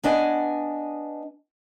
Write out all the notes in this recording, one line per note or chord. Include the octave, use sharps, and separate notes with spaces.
B3 D4 D#5 G#5